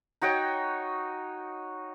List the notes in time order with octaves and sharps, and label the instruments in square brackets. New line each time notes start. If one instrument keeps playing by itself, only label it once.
[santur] D#4 F#4 C#5 G5